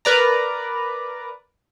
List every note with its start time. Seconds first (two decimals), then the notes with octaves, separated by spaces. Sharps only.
0.05 A#4 B4 D5 A#5